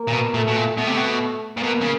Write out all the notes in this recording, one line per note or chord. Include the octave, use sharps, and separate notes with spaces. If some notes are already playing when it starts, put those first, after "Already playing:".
Already playing: A#3
A#2
B2
A#2 A3
B2
A#2
B2 A3
C3
B2
A#2
B2 A#3
C#3